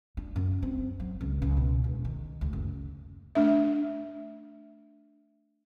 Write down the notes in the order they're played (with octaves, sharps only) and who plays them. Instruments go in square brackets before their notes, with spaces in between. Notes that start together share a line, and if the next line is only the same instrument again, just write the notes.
[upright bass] D4
F#2
C4
F#3
C#2
C#2
B2
E1
D#3
D2
F#1
[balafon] A3 D4 E5